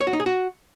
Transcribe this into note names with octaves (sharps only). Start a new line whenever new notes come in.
C#5
F#4
D#4
G#4
F#4